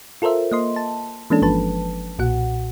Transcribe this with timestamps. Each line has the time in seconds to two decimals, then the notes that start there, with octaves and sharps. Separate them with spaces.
0.22 F4 A4 A#4 C5 E5
0.52 A#3 D#5 C6
0.76 A5
1.30 E3 G#3 A#3 C#4 D4 A4
1.42 G1 F3 B4 A5
2.19 B1 A#2 F#4 F#5